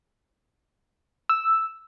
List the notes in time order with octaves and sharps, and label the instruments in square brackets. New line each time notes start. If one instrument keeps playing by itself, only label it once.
[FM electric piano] E6